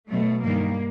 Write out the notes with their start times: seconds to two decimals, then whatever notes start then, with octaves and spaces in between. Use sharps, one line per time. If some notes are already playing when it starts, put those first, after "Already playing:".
0.10 B2 F#3 A3
0.44 G2 D#3 G3 A#3